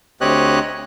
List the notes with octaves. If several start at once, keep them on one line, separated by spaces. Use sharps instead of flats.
D2 C4 G4 C#5 D#5 F#6